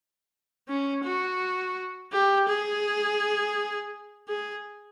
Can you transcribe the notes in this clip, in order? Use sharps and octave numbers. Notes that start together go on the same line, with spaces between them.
C#4
F#4
G4
G#4
G#4